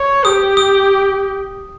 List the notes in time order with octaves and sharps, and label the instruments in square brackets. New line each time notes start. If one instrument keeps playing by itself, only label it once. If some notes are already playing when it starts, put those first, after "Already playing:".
Already playing: [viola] C#5
[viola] G4 [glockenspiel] D#6
[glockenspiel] D#6